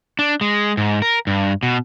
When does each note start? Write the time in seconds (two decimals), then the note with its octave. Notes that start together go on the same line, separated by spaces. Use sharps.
0.19 D4
0.41 G#3
0.77 G#2
1.02 A#4
1.27 G2
1.63 B2